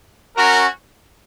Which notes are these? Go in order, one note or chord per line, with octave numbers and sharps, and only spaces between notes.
C#4 F#4 A#4